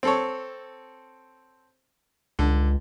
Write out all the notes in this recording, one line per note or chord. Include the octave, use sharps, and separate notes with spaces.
C4 A4 C#5
C#2 D3